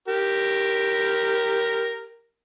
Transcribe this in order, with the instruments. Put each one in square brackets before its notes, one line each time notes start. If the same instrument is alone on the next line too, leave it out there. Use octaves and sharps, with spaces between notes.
[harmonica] G4 A#4